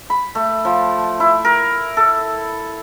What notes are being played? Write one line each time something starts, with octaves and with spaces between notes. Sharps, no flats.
B5
A3
F3
E4
A#4
A4